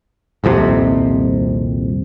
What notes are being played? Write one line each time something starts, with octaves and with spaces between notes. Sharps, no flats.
D#1 C2 F2 C3